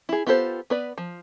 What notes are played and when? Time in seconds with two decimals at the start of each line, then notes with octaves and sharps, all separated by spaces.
0.09 E4 G#4
0.27 B3 F4 G4 A4 C5
0.70 B3 B4 D5
0.98 F3